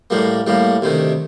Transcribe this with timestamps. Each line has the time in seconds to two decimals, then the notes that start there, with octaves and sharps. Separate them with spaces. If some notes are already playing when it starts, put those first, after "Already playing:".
0.10 A2 G3 A#3
0.47 A2 G3 A#3
0.82 D2 C3 D#3